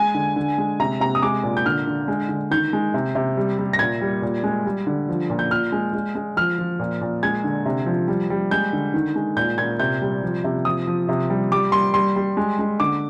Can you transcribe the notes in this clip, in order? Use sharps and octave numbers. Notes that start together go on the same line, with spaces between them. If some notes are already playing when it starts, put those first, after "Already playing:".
Already playing: G#3 G#5
D3
D3
G#3
C3 A#5
C3 A#5
D#6
G#3 D6
A#2
G6
D3 F6
D3
G#3
D3
D#3 G6
G#3
C3
C3
G3
G3
A#6
A#2 G#6
G3
A#2
G#3
G3
D3
F3
A#2
G6
A#2 F6
G#3
G#3
G#3
F3 F6
F3
A#2
A#2
G#3 G#6
D3
C3
F3
G3
G3
G#3 G6
D3
D#3
G#3
A#2 G6
A#2 G#6
C3 G6
G3
F3
C3
F3 D#6
F3
C3
G3
G3 D6
G3 C6
G3 C6
G3
G#3
G#3
D3 D6